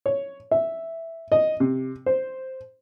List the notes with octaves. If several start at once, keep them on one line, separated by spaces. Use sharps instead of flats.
C#5
E5
D#5
C3
C5